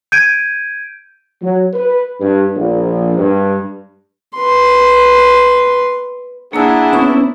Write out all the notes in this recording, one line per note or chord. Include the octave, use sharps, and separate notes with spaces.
G6 G#6 D7 D#7
F#3
B4
G2
A#1
G2
B4 C6
A#3 D4 E4 G#4 F#5 A#5 E6
B3 C#4 B5 C#6 D#6